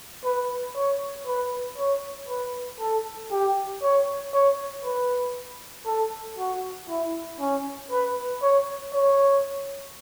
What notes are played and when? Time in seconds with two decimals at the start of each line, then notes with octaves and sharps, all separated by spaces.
0.24 B4
0.76 C#5
1.27 B4
1.78 C#5
2.28 B4
2.80 A4
3.31 G4
3.82 C#5
4.34 C#5
4.84 B4
5.86 A4
6.38 F#4
6.89 E4
7.40 C#4
7.91 B4
8.42 C#5
8.94 C#5